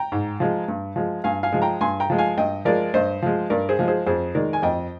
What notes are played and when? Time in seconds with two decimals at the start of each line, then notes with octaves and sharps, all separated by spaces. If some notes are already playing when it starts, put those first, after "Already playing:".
Already playing: G5 A#5
0.12 G#2
0.40 F3 G#3
0.68 G2
0.96 F3 G#3
1.24 G2 F5 G#5
1.43 F5 G#5
1.52 F3 G#3
1.62 G5 A#5
1.81 G2 G#5 C6
2.00 G5 A#5
2.10 F3 G#3
2.18 F5 G#5
2.37 G2 D#5 G5
2.65 F3 G#3 A#4 D5
2.94 G2 C5 D#5
3.22 F3 G#3
3.50 G2 A#4 D5
3.69 G#4 C5
3.79 F3 G#3
3.88 G#4 C5
4.07 F2 G#4 C5
4.35 D#3 G#3 A#4 D5
4.53 G#5
4.62 F2 D#5 G5